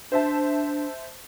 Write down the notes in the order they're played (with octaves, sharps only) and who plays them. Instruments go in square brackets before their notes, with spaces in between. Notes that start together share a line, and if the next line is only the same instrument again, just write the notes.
[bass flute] D4 [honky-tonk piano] C5 E5 A5